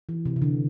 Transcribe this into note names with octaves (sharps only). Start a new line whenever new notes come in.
E3
C3
C3
D3